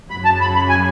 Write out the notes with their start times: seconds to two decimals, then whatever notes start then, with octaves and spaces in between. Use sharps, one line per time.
0.10 F#2 C#3 F#3 B5
0.25 A5
0.41 B5
0.56 B5
0.69 G#5